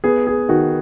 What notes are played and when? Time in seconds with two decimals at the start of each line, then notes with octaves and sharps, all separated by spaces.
0.04 B3 G#4
0.27 G#4
0.49 D#3 F#4